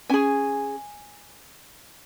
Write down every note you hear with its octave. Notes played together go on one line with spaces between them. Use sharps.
C#4 G#4 G#5